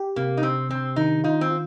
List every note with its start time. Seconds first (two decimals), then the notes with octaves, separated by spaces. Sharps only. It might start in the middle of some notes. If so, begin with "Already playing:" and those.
Already playing: G4
0.16 C3 A#3
0.37 D#4
0.43 C3 C4
0.70 C3 C4
0.96 D#3 D#4
1.24 D#4 F4
1.41 C4
1.50 F4